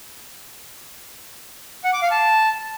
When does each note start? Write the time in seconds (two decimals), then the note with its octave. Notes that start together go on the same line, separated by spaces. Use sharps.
1.84 F#5
1.93 D6
2.02 F5
2.11 A5